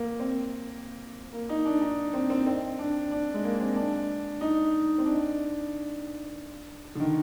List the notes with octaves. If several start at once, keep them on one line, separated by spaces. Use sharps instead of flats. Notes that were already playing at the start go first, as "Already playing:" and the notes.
Already playing: A#3
C4
A#3
D#4
D4
D#4
C4
C4
C4
D4
D4
G#3
A#3
C4
D4
D#4
C4
D4
D3
D#3